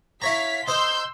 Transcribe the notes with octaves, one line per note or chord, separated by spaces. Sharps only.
E4 C#5 F5 A#5 B6
D#4 C5 C6 E6 G6